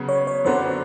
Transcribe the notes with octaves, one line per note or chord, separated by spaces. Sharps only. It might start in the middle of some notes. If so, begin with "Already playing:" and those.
Already playing: C#3 F#3 B3
C#5
C#5
F#2 D3 F#3 B3 D4 C5